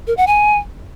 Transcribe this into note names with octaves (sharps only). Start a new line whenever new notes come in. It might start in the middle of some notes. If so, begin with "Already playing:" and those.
A#4
F#5
G#5